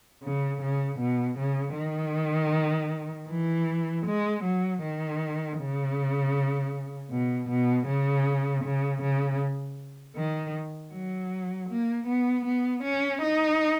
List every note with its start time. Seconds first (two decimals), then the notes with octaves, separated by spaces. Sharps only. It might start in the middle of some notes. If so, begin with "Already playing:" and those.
0.23 C#3
0.61 C#3
0.99 B2
1.38 C#3
1.77 D#3
3.29 E3
4.06 G#3
4.44 F#3
4.82 D#3
5.59 C#3
7.11 B2
7.49 B2
7.88 C#3
8.64 C#3
9.02 C#3
10.16 D#3
10.92 F#3
11.70 A#3
12.07 B3
12.46 B3
12.83 C#4
13.22 D#4